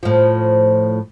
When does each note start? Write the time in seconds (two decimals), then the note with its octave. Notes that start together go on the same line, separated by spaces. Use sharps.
0.03 A2 F3